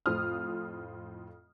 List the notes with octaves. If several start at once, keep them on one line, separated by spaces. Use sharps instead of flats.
F2 A2 F4 C5 D#6 F6